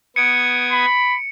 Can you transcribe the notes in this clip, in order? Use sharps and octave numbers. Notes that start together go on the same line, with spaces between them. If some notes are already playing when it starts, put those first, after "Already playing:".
B3 D#6 G#6 C#7 D7
B5